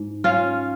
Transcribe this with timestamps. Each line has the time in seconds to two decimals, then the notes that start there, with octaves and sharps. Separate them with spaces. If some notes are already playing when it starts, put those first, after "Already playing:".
Already playing: G#2
0.24 C#4 F4